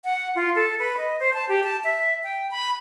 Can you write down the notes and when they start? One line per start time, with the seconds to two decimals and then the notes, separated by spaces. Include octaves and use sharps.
0.05 F#5
0.35 F4
0.56 A4
0.79 B4
0.97 D#5
1.20 C5
1.34 A5
1.49 G4
1.63 A5
1.84 E5
2.24 G5
2.51 B5